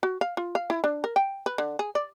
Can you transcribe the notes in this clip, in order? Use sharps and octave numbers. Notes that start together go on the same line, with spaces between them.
F#4
F5
F4
F5
E4
D4
A#4
G5
B4
D3
G#4
D5